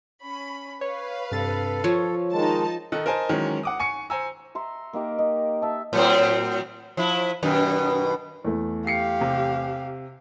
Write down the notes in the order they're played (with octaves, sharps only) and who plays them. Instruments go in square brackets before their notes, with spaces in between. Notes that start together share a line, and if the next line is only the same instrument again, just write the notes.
[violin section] C#4 B5
[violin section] B4 F5 [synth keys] C#5
[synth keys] G2 C3 A6 [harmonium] A4
[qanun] F3 [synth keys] C#5
[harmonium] D#3 G#3 [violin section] D#4 A5
[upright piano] D#3 D#4 A4 F#6
A#4 C5 D#5 G#5 A5
D#3 E3 F#3 G#3 C#4
F#5 D6 D#6
G#5 C#6 C#7
C5 G#5 A#5 E6
[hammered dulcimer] E5 A#5 C6
A#3 D#4 G4 A#4
D#5
E5 A5
[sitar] A2 F#3 C4
F3 E4
F#2 B2 D#3
[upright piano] E2 A3
[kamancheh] G4 F5 [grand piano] C7 C#7
[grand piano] C3